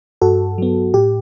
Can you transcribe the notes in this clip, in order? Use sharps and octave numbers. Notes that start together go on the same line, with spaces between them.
G2 F#4 A4
F#3 B3
A2 G4